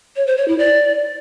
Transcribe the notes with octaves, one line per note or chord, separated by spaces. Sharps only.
C#5
C5
C#5
E4
D5